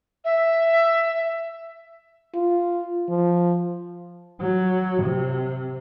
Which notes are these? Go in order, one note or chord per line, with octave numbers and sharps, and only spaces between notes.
E5
F4
F3
F#3
C3